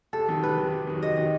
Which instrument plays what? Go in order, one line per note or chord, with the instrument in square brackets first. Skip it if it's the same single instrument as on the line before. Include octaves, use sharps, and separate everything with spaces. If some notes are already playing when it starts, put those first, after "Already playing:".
[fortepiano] C3 [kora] A4
[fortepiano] D#3 F#3
[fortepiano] C3 [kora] B4
[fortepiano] D#3 F#3
C3
D#3 F#3
[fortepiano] C3 [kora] D#5
[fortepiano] D#3 F#3